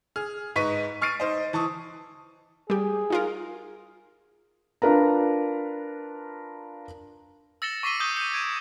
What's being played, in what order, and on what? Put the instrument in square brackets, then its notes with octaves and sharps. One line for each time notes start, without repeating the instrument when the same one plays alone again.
[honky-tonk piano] G#4 F6
G#2 D#4 B4 C#6 B6 D#7
C#6 F6 A6 C7 D7 D#7
D#4 C5 D#5
E3 A5 C#6 D#6
[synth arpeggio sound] G3 G4 [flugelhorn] G#4
[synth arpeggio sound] D#4 F4 A#4
[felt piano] D4 F4 A#4 B4 A#5
[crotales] E6 A6 A#6 C#7 E7 G7
C#6 D6 B6 C7 D#7 G7
C#6 D#6 G6 G7
G6 C#7
G#6 D7 E7